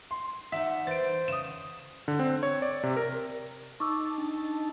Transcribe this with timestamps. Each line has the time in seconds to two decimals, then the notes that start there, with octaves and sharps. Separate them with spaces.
0.11 C6
0.52 D#4 D5 E5 F#5
0.87 E3 C5 A6 D7
1.28 C#3 D#6 E7
2.08 D3
2.19 C4
2.43 C#5
2.62 D5
2.83 C3
2.97 A#4
3.80 D#4 A5 C#6 D6 E6
4.18 D4